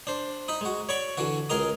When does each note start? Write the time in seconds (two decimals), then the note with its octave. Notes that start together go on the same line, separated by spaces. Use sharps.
0.07 D4 C5
0.48 D#4 B5 D#6
0.61 G#3 F#4
0.89 C#5 D5 B5 C#6 D6
1.17 D3 E3 F#4
1.49 C#2 G#4 A#4 D#5 A#5 D#6